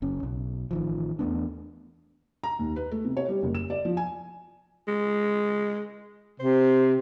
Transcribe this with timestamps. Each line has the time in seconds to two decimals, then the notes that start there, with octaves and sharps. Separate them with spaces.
0.02 F#1 C#4
0.23 B1
0.71 A1 D#3 F3
1.19 E2 A3 B3 D4
2.43 A#5
2.59 D#2
2.76 B4
2.91 A3
3.05 C3
3.17 C#5
3.29 G3
3.43 F#1
3.55 E7
3.70 D5
3.85 F3
3.97 G#5
4.88 G#3
6.40 C3 C5